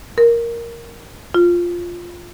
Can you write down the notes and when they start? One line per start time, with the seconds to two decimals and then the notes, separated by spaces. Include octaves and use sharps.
0.18 A#4
1.34 F4